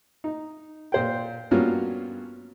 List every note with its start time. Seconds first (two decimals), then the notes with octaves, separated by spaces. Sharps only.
0.24 D#4
0.92 A#2 C5 G5
1.51 G2 F#3 A#3 B3 C#4 F4